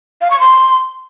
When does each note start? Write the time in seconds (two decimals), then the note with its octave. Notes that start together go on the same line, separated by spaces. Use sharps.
0.21 F5
0.30 C#6
0.40 C6